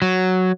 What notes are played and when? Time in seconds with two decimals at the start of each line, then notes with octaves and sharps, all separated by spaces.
0.02 F#3